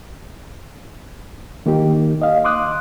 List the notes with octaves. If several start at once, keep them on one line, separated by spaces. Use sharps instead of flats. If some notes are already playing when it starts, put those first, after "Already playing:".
D#3 A#3 D#4 G4
D#5 F5
C6 D6 D#6 F#6